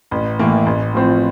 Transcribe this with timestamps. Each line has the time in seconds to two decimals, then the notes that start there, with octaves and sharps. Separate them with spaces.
0.11 A1
0.39 A2 E3 A#3
0.66 A1
0.94 A2 F3 C4